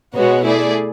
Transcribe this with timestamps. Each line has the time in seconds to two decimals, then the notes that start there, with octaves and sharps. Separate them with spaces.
0.14 B2 G#3 B3 F#4 C#5
0.43 A3 E4 G#4 D5